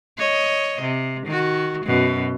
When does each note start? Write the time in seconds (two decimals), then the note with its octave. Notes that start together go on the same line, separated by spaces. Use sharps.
0.18 C#5 D#5
0.81 C3
1.26 D#3 F#4
1.85 F#2 B2